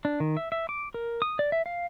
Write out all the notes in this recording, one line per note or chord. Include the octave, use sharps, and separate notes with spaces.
D4
D#3
E5
E5
D6
A#4
D#6
D5
E5
F5